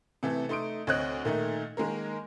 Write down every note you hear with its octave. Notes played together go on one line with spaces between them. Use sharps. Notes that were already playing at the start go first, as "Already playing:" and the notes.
C3 E3 A3 A4
A3 D#4 C6 D#6 D7
D2 C4 C#5 D#5 F#6
A#2 D#3 A3 D#4
D#3 G#3 A#3 A#4